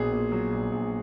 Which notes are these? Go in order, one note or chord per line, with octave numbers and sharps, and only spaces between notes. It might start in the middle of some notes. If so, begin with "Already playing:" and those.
Already playing: A#1 B2 G#4
A#2
F#3
A#1
A#1